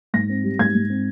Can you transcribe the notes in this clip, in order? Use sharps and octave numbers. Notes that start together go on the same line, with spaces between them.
G#2 A#6
C4
G3
G#2 G#6
G#2
C4